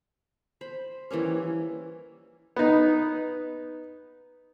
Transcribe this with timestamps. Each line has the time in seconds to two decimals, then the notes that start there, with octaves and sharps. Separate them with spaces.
0.61 C5 B5
1.11 E3 G3 A#3 C#4
2.56 B3 D#4